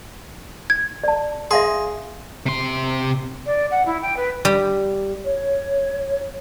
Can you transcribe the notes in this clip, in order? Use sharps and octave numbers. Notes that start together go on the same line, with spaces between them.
G#6
D5 A5
G#4 E5 F5 C6
C3 C6
D5
F#5
E4
G5
B4
G3
C#5